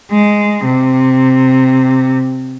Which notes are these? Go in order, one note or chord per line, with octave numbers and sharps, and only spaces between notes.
G#3
C3